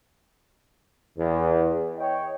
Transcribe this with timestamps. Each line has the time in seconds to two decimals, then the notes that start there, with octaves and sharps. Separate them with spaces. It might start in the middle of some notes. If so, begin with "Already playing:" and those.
1.17 E2
1.97 C#5 D#5 G5